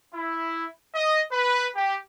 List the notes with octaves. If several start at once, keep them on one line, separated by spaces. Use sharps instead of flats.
E4
D#5
B4
G4